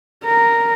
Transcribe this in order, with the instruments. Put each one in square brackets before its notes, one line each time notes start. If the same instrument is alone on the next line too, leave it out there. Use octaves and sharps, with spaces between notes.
[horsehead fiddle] A#4